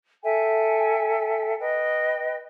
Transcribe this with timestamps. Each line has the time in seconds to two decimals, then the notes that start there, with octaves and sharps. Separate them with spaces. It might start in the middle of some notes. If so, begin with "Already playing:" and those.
0.23 A4 E5 G5 G#5
1.59 B4 D#5 G5